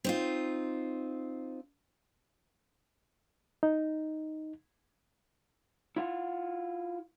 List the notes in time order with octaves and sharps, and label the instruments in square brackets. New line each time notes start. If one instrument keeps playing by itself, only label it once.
[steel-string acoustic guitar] C4 D#4 F4
[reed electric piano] D#4
[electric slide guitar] E4 F4 F#5